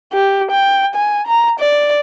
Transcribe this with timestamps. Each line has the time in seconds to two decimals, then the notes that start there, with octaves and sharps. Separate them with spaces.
0.13 G4
0.51 G5
0.95 G#5
1.27 A#5
1.60 D5